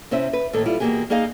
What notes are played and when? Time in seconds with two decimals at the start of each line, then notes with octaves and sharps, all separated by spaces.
0.11 C3 C#4 E4 C5 E5
0.33 B4
0.53 D#2 A2 A4
0.66 G3 E4 F4
0.80 E2 B2 F3 A#3 G4 G#4
1.10 A#3 D#4 G#4 D#5 F5